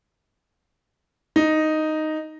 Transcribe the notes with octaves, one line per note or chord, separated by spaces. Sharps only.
D#4